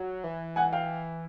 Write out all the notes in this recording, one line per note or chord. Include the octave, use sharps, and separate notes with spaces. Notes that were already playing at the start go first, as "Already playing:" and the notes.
Already playing: F#3
E3
F#5 G#5
F5 G5